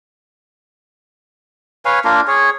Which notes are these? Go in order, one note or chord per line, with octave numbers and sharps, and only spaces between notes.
B4 C#5 F5 G#5
A#3 D4 F4 A#4
G#4 C#5